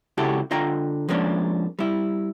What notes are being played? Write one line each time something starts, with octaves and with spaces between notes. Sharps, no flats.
C#2 C#3 E4 F#4 G4 A4
D3 F4 D#5 G5 A#5
F3 G#3 A#3 C#4 D4
G3 E4